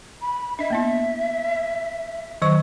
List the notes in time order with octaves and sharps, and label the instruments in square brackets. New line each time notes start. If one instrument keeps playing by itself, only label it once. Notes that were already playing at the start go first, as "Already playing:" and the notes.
[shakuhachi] B5
[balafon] D4 D#5 [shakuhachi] E5
[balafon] A#3 B3 E4
D#3 F#3 C#6